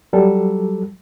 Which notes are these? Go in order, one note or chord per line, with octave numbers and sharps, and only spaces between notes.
F#3 G3 A4